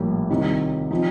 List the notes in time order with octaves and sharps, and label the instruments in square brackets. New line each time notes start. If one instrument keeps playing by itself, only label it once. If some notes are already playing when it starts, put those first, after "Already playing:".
Already playing: [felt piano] A#1 A2 G3 A#3
C2 C3 D#3
F3 C4 D#4